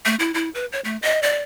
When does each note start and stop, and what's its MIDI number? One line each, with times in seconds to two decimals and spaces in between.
0.05 0.16 57
0.19 0.34 64
0.34 0.49 64
0.55 0.66 71
0.72 0.80 73
0.85 0.97 57
1.02 1.20 75
1.23 1.43 74